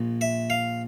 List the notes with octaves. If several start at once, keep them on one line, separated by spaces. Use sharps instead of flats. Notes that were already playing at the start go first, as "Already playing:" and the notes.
Already playing: A#1 A#2
E5
F5